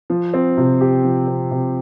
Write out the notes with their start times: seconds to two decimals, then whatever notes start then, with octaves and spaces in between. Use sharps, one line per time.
0.10 F3
0.34 C4
0.57 C3
0.81 G4
1.04 F3
1.28 C4
1.51 C3